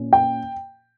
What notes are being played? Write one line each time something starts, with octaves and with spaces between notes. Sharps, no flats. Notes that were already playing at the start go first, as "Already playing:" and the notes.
Already playing: A#2 C#4
G5